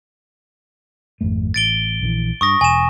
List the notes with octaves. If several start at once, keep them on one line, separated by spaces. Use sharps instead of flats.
G#1 F2 A3
A1 A6 D7 G7
A#1 D3 E3
G2 C#6 D#6 A#6
E1 G#5 E7